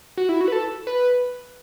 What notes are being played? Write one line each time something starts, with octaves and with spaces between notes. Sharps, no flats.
F#4
E4
F#4
B4
A4
B4